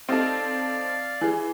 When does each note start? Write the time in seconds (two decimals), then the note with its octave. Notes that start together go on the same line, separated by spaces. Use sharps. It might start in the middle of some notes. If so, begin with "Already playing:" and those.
0.09 C4 D#4 A4 D5 F5
1.21 E3 G#4